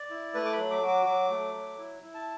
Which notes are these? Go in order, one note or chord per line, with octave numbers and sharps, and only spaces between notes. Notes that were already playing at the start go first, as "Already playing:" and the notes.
Already playing: D5
E4
A3 B4
D6
B5
F#3
D6
F#4
D6
F#3 D6
A3
F#3
E4
E4
A5